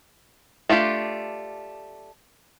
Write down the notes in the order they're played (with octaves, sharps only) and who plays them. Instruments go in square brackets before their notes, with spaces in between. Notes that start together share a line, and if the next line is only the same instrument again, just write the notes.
[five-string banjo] A3 D4 F4 G4